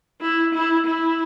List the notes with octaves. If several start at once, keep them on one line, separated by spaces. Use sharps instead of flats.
E4
E4
E4